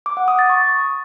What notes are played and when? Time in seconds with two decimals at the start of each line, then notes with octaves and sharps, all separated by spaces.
0.06 D6
0.17 F#5
0.28 D#6
0.39 A6
0.50 C#6